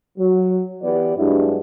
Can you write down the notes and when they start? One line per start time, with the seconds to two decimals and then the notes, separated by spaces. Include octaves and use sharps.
0.18 F#3
0.83 E3 B3 G4 D5
1.17 G2 F#3 G#3 D4 E4 G4